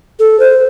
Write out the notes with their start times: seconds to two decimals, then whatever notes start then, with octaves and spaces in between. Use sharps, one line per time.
0.19 A4
0.40 C5